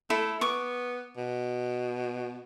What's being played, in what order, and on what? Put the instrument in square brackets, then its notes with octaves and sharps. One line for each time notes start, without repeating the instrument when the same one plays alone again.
[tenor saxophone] A3 [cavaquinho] E4 A4
[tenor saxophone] B3 [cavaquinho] C#6 D6
[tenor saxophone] B2